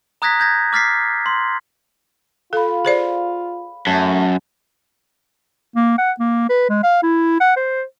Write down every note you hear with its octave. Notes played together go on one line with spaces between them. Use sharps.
A#5 D#6 F#6 G#6 A#6 B6
G6 G#6 A#6
D6 F6 A6 B6 C7
C6
F4 A4 F5 B5
G#4 C5 D5
F#2 A3 A5
A#3
F#5
A#3
B4
G#3
F5
E4
F#5
C5